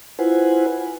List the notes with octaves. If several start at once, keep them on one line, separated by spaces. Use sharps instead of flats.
E4 F4 B4 C5 F#5 G#5